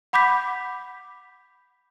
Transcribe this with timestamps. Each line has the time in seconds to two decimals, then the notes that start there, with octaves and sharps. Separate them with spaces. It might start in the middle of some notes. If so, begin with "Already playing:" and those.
0.13 F#5 B5 D6 G6 B6